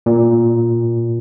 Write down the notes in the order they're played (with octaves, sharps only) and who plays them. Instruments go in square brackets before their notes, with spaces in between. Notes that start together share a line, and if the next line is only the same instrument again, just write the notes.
[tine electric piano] A#2